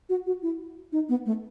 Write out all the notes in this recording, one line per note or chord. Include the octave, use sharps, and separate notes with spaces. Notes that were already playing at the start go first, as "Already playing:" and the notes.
F#4
F#4
E4
D#4
B3
A3